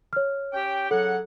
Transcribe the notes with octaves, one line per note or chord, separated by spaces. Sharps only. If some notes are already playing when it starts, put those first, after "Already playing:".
C#5 F6
C#4 G4 G5
C#3 F#3 A4 F#5